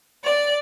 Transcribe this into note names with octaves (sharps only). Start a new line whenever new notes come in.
D5